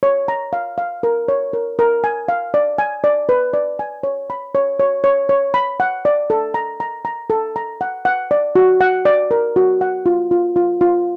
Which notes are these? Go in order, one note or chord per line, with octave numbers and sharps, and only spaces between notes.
C#5
A#5
F5
F5
A#4
C#5
A#4
A#4
G#5
F5
D5
G#5
D5
B4
D5
G#5
C#5
B5
C#5
C#5
C#5
C#5
B5
F#5
D5
A4
A#5
A#5
A#5
A4
A#5
F#5
F#5
D5
F#4
F#5
D5
A#4
F#4
F#5
F4
F4
F4
F4